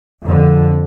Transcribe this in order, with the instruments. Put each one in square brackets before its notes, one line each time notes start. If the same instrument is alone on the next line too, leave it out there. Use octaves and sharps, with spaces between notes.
[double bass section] F2 D3